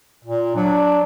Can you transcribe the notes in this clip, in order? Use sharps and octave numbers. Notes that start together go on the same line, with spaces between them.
A#2
F#3 D4